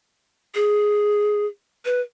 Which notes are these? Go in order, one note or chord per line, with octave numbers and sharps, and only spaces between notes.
G#4
B4